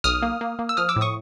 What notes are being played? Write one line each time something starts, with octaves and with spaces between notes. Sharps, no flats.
B1 D#6 F6
A#3
A#3
A#3
E6
F3 D#6 F6
D6 E6
A2
C#6 D#6